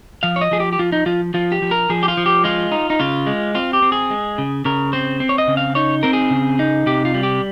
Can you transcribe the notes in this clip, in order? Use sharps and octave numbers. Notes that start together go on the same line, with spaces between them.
F3 F5
C#5
D#5
F3 G#4
G4
G4
F3 F4
D#4
F3 F4
F3 F4
G4
F3
A#4
F3 G#4
G4
F4
F3
G4
G#3 F4
D#4
D#4
C#3 F4
G#3
C4 F4
G4
C4
G#4
G#3
C#3
C#3 A#4
C4 C5
C4
C#5
D#5
C#3
F5
D#4 C#5
C4 A#4
G#4
C#3
D#4
C3 G4
F4
G3
G4